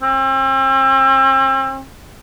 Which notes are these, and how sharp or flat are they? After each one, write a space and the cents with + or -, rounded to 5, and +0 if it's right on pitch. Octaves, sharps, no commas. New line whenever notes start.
C4 +40